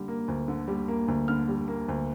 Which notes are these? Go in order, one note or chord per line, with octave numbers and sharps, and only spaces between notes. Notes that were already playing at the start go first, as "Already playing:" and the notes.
Already playing: D3 G3
A#3
D2
D3
G3
A#3
D2
D3 F6
G3
A#3
D2